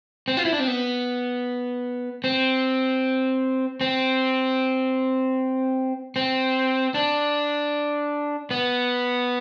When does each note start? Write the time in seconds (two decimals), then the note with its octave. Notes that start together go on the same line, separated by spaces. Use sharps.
0.28 C4
0.37 F4
0.45 E4
0.53 D4
0.60 C4
0.68 B3
2.24 C4
3.81 C4
6.16 C4
6.94 D4
8.51 B3